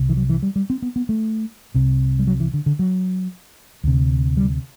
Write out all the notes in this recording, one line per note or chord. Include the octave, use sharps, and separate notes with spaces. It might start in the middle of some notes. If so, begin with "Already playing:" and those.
Already playing: C2 C3
E3
F#3
E3
G3
G3
C4
B3
B3
A3
C2 C3
G3
F#3
E3
D3
D3
F#3
D2 C3
G3